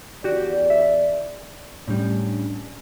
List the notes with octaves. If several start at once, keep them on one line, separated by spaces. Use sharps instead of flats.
E2 F#4 G4 D5
E5
A2 G3 C#4 D4